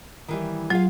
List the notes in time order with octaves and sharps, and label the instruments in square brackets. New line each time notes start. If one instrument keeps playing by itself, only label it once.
[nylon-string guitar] D#3 E3 G3
[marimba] F#3 [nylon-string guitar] F4 G#4 F5